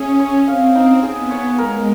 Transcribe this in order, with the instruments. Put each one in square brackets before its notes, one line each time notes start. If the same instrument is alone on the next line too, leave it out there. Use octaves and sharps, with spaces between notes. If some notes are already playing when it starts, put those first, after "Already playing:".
Already playing: [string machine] C#4 [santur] G#4 E5
[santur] C#5
[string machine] C4 [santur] F5
[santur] D#4
[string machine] B3 [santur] G#4
[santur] C#5
[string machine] G#3 [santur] A#4